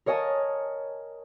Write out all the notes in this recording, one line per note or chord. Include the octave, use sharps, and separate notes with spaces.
A#4 C#5 D#5 G#5 A5